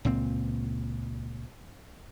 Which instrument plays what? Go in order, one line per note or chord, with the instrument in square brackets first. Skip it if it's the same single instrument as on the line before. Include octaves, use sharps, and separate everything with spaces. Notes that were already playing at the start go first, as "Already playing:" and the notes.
[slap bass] C#2 A#2 C4